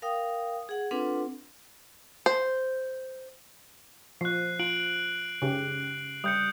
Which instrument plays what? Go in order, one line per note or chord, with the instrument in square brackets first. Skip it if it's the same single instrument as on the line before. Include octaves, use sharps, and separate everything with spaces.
[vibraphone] A#4 F5 G5 D#6
G#4 F#5
C4 D4 F4 A4 B4 F#5
[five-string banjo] C5
[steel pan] F3 [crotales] F#6 C7
[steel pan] F4 [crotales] D7 F#7
[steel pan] C#3 G4
[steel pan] G3 [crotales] D#6 G6 C#7